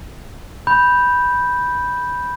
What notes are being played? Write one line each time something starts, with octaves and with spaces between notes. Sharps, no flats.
B5 G6